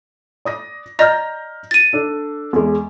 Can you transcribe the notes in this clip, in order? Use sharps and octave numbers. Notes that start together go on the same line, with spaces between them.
D5 D#6 A#6
D5 D#5 A#5 F6 G6 A#6
A6 D#7
D4 A4
E2 G#3